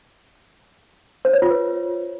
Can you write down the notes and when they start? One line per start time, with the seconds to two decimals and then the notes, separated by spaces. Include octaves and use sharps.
1.25 C5
1.33 C#5
1.42 F4
1.51 B4